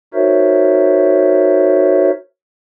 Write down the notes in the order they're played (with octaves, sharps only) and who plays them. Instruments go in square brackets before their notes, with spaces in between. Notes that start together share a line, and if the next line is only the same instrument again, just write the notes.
[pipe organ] D#4 F#4 A#4 C5 C#5 E5